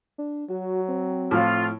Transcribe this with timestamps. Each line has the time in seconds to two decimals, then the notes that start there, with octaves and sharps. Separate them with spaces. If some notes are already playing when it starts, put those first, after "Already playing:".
0.18 D4
0.50 F#3 F#4
0.88 C4
1.31 A2 F3 F4 F6